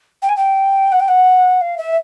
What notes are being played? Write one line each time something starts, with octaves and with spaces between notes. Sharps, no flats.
G5
G#5
G5
F#5
G5
F#5
F5
E5